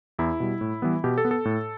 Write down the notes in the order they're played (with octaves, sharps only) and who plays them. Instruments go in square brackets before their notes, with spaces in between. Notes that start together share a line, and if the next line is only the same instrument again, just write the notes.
[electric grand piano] E2 E4
B2 G3
A2
E3 G3 B3
B2 G4
A4
B3
A4
A2